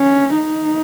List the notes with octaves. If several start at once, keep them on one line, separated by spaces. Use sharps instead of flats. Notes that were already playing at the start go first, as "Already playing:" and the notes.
Already playing: C#4
D#4